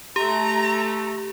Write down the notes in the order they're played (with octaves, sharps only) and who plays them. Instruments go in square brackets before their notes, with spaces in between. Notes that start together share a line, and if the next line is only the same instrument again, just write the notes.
[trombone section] A3 [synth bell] G4 [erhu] A#5